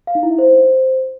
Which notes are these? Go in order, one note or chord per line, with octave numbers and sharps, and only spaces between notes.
F5
D#4
E4
E5
C5